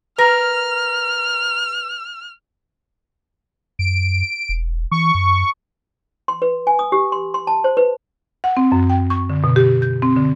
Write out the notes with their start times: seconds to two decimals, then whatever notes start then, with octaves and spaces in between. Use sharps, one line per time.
0.18 A#4 B4 F6 A#6
3.79 F#2 D7
4.49 E1
4.91 E3 C#6
5.15 F#2
6.28 C6
6.42 B4
6.67 G#5
6.79 D#6
6.92 G4
7.12 C6
7.34 C6
7.47 A5
7.64 C5
7.77 B4
8.44 F#5
8.57 C4
8.72 F#2
8.90 G5
9.10 C#6
9.30 D3
9.44 B2
9.56 G4
9.82 G6
10.02 C4
10.16 D3